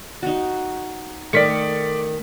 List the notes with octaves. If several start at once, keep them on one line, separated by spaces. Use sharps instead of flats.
D#4 F#4
D#3 A3 D5 B6 C#7